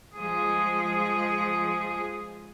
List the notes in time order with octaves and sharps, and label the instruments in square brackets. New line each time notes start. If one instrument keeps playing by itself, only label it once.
[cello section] F3 G#3 G#4